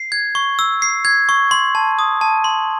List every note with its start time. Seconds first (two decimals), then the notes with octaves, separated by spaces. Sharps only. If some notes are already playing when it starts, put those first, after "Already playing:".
Already playing: C7
0.12 G#6
0.35 C#6
0.59 E6
0.82 C7
1.05 G#6
1.29 C#6
1.51 C6
1.75 A5
1.99 D#6
2.21 A5
2.44 C6